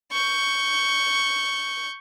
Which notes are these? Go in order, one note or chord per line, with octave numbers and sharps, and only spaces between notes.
C#6 G6